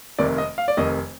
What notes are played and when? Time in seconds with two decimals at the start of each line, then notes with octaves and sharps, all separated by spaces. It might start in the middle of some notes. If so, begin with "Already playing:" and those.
0.18 F1 F2 D#3 D5
0.38 D#5
0.58 F5
0.68 D5
0.77 F1 F2 D#3 D#5